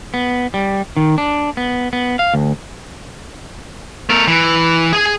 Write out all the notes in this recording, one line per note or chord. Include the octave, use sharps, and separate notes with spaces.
B3
G3
D#3
D4
B3
B3
F5
D2
A3 A#4
E3
G#4 G#5